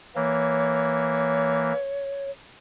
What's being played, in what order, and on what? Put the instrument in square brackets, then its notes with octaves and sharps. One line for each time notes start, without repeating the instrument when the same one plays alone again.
[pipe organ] E3 A#3 [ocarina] C#5